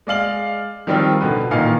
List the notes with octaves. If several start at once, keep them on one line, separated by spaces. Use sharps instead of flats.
G#3 D5 F5 F#7
D#3 F3 G3 C4 F4 G4
B2 D3 B4
A1 A#2 D#3 D#4 F5